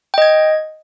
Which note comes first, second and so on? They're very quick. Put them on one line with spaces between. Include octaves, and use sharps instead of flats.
G5 D#5 G#6